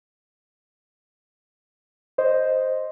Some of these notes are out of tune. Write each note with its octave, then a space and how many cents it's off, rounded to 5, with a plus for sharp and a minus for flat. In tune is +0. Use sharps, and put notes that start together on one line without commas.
C5 +0 D#5 +0